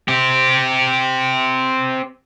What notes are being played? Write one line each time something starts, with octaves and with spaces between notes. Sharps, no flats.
C4 G4